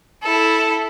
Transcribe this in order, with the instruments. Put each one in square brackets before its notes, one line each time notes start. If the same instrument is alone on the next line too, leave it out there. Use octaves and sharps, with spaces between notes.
[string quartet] E4 A4